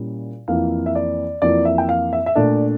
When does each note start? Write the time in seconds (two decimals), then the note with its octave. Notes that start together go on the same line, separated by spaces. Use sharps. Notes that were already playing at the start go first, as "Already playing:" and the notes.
Already playing: A#2 G3 C#4 E4
0.48 F2 E3 A#3 F5
0.86 E5
0.95 D5
1.42 F2 E3 A#3 D5
1.65 E5
1.78 G5
1.89 F5
2.13 E5
2.26 E5
2.35 A#2 A3 D4 D5